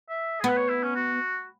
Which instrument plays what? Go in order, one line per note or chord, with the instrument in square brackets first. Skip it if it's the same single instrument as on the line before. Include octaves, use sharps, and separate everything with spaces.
[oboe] E5
G#4
[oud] B3 [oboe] B4
[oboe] C#5
E4
C#4
F#4